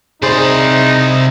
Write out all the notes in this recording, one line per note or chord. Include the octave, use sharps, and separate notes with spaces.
C3 D#4 G#4 C5 D5 C6